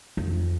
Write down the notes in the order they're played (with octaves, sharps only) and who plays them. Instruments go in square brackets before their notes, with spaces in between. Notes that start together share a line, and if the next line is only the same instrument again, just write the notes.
[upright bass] F2